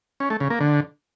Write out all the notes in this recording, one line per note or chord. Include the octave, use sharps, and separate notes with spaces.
C#4
A3
C#3
A#3
D3